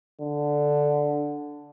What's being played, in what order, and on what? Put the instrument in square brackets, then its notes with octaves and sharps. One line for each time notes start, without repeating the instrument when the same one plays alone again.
[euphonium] D3